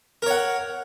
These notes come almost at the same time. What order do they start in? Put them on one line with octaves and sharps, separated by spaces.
A#4 C#5 F#5